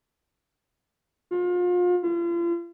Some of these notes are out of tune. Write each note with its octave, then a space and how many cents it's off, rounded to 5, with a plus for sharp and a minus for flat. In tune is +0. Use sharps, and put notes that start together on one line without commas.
F4 +35
F4 -40